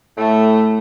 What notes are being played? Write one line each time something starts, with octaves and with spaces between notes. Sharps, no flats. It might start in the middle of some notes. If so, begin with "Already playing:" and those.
A2 A3